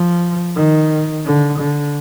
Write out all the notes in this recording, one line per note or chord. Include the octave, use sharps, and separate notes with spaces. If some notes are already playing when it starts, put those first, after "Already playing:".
Already playing: F3
D#3
D3
D3